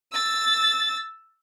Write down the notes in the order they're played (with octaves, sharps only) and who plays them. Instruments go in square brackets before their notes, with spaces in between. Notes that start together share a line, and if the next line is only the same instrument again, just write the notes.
[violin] E6 A6